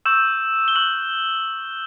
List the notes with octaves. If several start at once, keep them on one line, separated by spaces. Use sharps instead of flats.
C#6 E6 G6 E7
G7
C#6 F#6 F#7